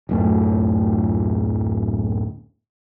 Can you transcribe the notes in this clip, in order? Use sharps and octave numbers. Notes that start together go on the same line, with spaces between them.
D1 F#2 A3